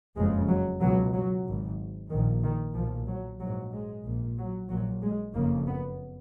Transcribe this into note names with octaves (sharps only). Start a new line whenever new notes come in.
F#1 F2 C#3 G#3
F#3
C#2 B2 F#3
F#3
G#1 G#2
A#1 A#2 D#3
D#3
B1 A#2 F3
F#3
A#1 G#2 F#3
G#3
A#1 A#2
F#3
A#1 A#2 F#3
G#3
F#1 F2 C#3 A#3
B3